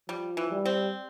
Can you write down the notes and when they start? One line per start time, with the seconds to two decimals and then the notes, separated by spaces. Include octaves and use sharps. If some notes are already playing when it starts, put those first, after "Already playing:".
0.08 F3 G3
0.37 E3
0.51 G3
0.66 C4